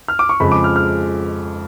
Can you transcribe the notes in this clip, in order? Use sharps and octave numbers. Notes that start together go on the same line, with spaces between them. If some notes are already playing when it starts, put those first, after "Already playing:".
F6
D6
C#6
F2 C#3 F3 G#3 B5
D6
F6
F6